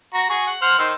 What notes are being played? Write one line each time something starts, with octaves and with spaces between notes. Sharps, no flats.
F#4 A#5
F#4 G#4 C#6
F#5
C5 F#5 F6
D#3 C5 E6